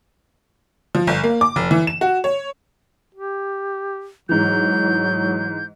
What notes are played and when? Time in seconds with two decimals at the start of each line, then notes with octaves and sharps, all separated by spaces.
0.95 F3
1.07 G1
1.24 A#3
1.41 D6
1.56 F1
1.71 E3
1.87 E7
2.01 F#4
2.24 C#5
3.15 G4
4.29 G#2 E3 F#3 G6